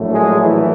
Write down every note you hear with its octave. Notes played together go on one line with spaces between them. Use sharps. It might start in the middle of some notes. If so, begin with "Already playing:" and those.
Already playing: A#1 A2 F#3 A3
G#3 G#4
E3 E4